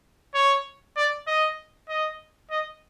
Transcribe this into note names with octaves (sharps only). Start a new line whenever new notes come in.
C#5
D5
D#5
D#5
D#5